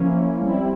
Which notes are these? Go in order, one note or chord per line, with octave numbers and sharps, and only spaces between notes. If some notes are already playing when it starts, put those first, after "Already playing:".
Already playing: F3 A#3 C#4 E4
G3 C4 E4